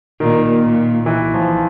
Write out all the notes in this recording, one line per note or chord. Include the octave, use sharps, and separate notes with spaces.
A#2 D#3
A#2
E3
F3